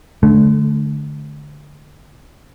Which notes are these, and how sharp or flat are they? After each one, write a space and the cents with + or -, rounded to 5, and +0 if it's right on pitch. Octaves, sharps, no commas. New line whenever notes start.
D3 +0 A3 -30